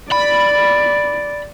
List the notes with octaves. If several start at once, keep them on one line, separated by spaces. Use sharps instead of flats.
D5 B5